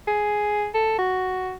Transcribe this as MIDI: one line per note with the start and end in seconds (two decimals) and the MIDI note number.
0.07 0.68 68
0.74 0.94 69
0.99 1.55 66